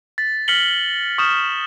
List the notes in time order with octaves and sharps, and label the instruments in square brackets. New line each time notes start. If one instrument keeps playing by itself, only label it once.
[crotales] A6 B6
F6 A#6 B6 C#7 F#7 G7
C#6 D#6 F6 G6 E7